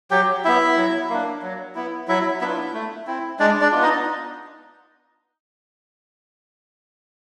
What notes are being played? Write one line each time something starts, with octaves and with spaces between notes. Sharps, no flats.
F#3 G4 G5
B3 E4 E5
F#3
A#3 D4
F#3
B3 E4
F#3 E4 E5
B3 D4 E4 F4 E5
A3
C4 E4
G#3 D4 D5
D4 D5
B3 D4 F4
D#4 D#5